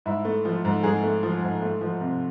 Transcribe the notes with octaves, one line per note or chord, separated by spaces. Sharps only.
G#2 E4
A3
F3
G#2
G#2 G#4
A3
F3
G#2
A3
F3
C3